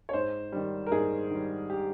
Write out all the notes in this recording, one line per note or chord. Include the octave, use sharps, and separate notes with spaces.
C#5
G#2 C5
D#3 G3
A#4
G#2 G#4
D#3 G3
G4